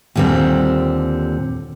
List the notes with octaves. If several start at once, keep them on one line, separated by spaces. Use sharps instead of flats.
D#2 A#2 D3 G3 C4